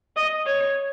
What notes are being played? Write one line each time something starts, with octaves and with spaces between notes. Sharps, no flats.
D#5
C#5